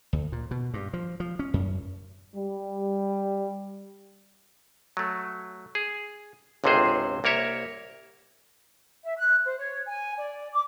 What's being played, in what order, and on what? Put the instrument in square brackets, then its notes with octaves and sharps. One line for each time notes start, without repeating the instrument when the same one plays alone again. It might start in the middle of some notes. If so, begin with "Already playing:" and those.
[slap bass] D2
A#2
B2
G2
F3
F3
C#4
F#2
[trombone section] G3
[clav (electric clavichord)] F#3 A3
G#4
G1 C#2 C3 F#4 G#4 C5
C2 A#3 A#4 C#5 E5
[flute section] E5
F#6
C5
C#5
G#5
D5
D6